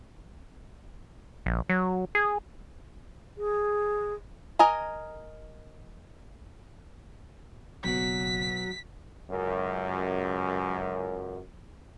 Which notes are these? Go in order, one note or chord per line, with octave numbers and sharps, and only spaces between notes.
A#1
F#3
G#4
G#4
A#4 D#5 G#5 A#5
F#1 B2 F#3 F#4 B6
C#2 F#2